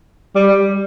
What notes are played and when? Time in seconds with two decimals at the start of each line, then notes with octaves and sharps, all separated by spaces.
0.35 G3